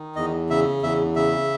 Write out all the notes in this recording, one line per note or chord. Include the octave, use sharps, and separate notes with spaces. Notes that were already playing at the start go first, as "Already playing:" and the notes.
Already playing: D#3
E2 D#5
C#3 E5
E2 E5
C#3 E5